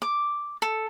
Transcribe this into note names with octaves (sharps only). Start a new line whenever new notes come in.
D6
A4